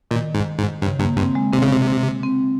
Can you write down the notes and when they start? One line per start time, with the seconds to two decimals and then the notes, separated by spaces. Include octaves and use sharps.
0.11 A#2 D#3
0.35 G#2
0.58 G#2
0.82 G2 C#3
1.00 G2 A#3
1.17 G2 C4
1.35 G#3
1.53 C3 C4
1.62 C#3
1.71 C3
2.23 C4